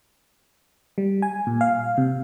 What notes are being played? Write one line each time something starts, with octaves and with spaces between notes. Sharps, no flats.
G3
G#5
A#2
F5
C3